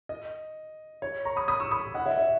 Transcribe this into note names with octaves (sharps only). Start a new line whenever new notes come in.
D#5
C#5
A#5 C#6
B5 D#6
B5 D#6
C#6 E6
B5 D#6
D#5 F#5
C#5 E5
C#5 E5